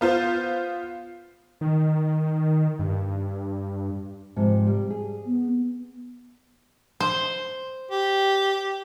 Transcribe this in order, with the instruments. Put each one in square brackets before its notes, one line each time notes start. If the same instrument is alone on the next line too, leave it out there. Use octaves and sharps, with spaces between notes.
[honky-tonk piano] B3 F4 C5
[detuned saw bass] D#3
G2
[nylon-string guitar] G#2 C3 F3
G3
G#4
[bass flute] B3
[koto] C5
[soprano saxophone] G4